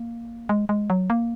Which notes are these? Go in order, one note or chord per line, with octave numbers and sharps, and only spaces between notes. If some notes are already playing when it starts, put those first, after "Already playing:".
Already playing: A#3
G#3
G#3
F#3
A#3